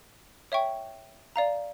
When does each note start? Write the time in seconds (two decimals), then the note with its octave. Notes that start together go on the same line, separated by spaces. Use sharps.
0.52 C#5 E5 G5 C#6
1.36 D5 F5 A#5